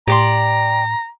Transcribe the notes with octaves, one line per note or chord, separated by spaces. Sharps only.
A2 G4 D5 A#5 C6